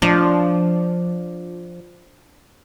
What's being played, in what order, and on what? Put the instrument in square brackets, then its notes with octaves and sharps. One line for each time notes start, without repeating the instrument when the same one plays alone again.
[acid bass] F3 [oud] D4